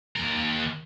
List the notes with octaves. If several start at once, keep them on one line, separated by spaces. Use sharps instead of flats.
D#2 A#4